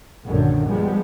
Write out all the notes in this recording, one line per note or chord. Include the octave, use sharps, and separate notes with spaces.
A#1 F#2 D3 D#3
F3 G3 G#3 B3